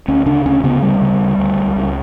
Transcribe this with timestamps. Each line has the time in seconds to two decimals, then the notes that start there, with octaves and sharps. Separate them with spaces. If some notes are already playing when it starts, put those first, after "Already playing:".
0.08 D2 C#4
0.26 C#3 D4
0.45 D2 C#4
0.64 C#3 B3
0.82 D2 G3
1.02 C#3
1.20 D2
1.39 D2
1.58 C#2
1.76 C#2